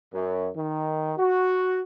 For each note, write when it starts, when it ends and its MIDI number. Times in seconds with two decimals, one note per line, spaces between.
0.13 0.50 42
0.56 1.14 51
1.18 1.79 66